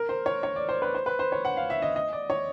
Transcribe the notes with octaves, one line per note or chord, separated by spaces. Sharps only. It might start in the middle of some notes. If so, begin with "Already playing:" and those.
Already playing: A#4
C5
C#5
C#5
D5
C5
B4
C5
B4
C5
C#5
F#5
F5
E5
D#5
D#5
D5
C#5